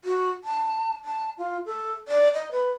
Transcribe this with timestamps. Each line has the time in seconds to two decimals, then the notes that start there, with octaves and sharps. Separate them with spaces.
0.04 F#4
0.44 A5
1.05 A5
1.38 F4
1.66 A4
2.08 D5
2.34 D#5
2.51 B4